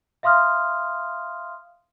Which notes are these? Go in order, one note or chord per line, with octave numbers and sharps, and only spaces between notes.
E5 F5 C6 D#6 F6